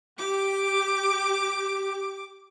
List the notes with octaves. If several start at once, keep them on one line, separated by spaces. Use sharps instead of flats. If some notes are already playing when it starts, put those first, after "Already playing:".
G4 D6